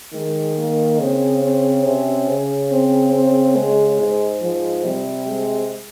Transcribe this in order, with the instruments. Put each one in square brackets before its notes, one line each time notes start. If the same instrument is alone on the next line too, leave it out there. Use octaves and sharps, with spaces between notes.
[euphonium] D#3 [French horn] G#3
[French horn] A#3
[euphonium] C#3 [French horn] C4
[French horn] C4
[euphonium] C3 [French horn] C#4
[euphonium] C#3
[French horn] C4
C4
G#3
[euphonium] G#2
[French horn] F3
[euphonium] C3 [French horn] G3
[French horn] G#3